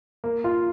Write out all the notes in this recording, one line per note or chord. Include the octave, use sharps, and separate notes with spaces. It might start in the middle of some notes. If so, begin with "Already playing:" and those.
A#3
F4